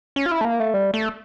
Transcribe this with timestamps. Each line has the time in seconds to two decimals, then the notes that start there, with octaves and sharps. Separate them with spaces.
0.16 C#4
0.26 F4
0.31 E4
0.41 A3
0.45 A#3
0.60 A3
0.74 G3
0.94 A3